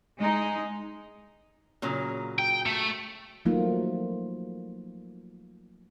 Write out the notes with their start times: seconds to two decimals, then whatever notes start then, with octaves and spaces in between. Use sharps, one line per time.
0.18 G#3 D#4
1.82 A#2 C#3 F#3
2.39 G5
2.66 A3
3.45 F3 F#3 A3 A#3 D#4 F4